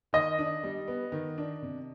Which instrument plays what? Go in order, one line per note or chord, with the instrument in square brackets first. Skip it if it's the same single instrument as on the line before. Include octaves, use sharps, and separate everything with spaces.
[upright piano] D#3 [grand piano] D#5
[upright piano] D4
G3
B3
D#3
D4
C3